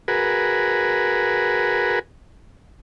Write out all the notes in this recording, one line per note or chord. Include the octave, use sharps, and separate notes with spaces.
F#4 G#4 A#4 B4